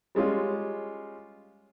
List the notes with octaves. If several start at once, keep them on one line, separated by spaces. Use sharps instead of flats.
G3 G#3 C#4 F4